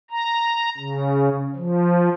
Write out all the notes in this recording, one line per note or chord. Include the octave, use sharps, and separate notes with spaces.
A#5
C#3
F3